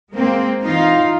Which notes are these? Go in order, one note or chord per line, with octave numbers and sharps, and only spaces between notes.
G#3 A#3 C4
E3 D#4 F4 F5